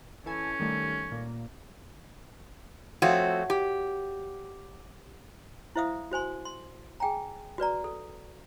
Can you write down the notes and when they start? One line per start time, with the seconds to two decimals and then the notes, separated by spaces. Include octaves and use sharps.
0.26 E3 C#4 A4 G#5
0.60 D#3 G3 A3
1.12 A#2
3.02 F3 A3 C4 F#4 C#5
3.50 G4
5.76 E4 C5 E5 F5 D#6
6.11 F#4 C5 G#5 C6
6.45 C6
7.00 G#4 G5 G#5 A#5
7.58 F#4 B4 D5 A#5
7.84 A4